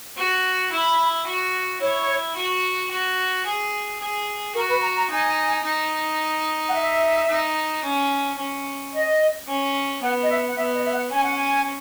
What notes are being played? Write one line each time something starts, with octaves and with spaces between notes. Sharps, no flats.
F#4
E4 B5
F#4
E4 C#5
F#4
F#4
G#4
G#4
F#4 A#4
B4
A#5
A#5
D#4 G#5
D#4
F#5
E5
D#4
C#4
C#4
D#5
C#4
B3 F#5
D#5
E5
F#5
B3 E5
D#5
E5
F#5
C#4 G#5
F#5
G#5